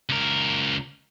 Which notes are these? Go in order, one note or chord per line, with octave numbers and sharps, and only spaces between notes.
C#2 A#4